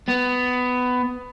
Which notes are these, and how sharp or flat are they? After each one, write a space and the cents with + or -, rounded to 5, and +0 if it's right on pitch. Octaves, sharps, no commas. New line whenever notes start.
B3 +15